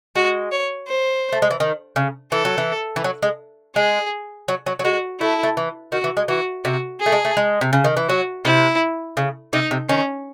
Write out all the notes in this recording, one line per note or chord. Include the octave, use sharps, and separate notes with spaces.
G#3 F#4
C#5
C5
A3
G#3
E3
D#3
C#3
E3 A4
F#3
E3
E3
F#3
G#3
G#3 G#4
F#3
F#3
F#3
G#3 F#4
A3 E4
A3
E3
D#3 F#4
E3
G#3
E3 F#4
C3 F#4
G#4
A3
G#3
A3
G#3
C3
C#3
D#3
E3
F#3 F#4
C3 E4
C#3
C3 D#4
C3
D#3 C#4